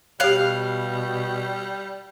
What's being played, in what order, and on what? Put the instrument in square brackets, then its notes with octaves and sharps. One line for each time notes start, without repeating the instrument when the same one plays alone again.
[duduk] B2 [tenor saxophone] G3 [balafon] G4 C#5 [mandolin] F5 F#6